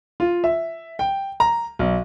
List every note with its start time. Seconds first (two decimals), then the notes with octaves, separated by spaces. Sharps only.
0.20 F4
0.44 E5
0.99 G5
1.40 A#5
1.79 B1